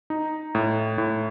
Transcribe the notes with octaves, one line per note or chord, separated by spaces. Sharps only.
D#4
A2
A2